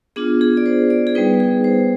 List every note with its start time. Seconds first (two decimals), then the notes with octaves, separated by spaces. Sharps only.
0.16 B3 D4 F4 G#4
0.41 G#4
0.57 D5
0.66 C5
0.90 D5
1.07 G#4
1.15 G3 B3 D#4 B4
1.40 G#4
1.64 C5